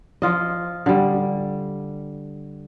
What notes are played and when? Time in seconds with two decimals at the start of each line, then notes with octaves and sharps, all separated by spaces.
0.22 F3 F4 D#5
0.86 D3 G3